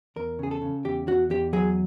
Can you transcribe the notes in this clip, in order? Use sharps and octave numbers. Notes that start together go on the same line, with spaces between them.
E2 A#4
C#3 G#4
A4
C#3
E2 G4
E2 F#4
E2 G4
F#3 G#4